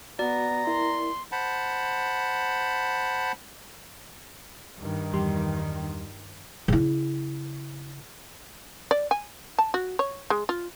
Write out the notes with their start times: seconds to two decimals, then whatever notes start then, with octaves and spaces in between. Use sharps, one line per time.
0.19 B3 F#4 D5 A#5
0.67 E4 A#4 C6
1.32 C5 F#5 A5 B5
4.80 G2 D#3
5.13 E2 G3 C6
6.68 C#3 E4
8.91 D5
9.11 G#5
9.58 A5
9.74 F#4
9.99 C#5
10.30 G#3
10.49 F4